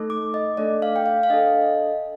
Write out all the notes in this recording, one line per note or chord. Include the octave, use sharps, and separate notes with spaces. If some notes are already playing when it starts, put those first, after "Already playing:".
Already playing: A3 D#4 A4
D6
D#5
A3 D4 A4 D5
F5
G5
F5
F5
D4 A4 D#5